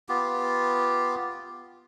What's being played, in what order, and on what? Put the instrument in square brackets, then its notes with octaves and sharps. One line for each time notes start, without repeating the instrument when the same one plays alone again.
[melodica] B3 F4 G4